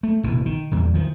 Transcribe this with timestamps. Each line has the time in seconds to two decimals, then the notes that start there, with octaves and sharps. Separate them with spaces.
0.03 A3
0.23 F1 A#1 B2 E3
0.46 D#3
0.71 A#1 E2 G3
0.94 D#3 F3